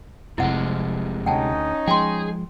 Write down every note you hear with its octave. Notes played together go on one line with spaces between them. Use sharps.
F1 F2 C3 G#3 E4 F#5
D2 C#4 D#4 F#5 G5 A5
F3 G#3 G#4 G5 C6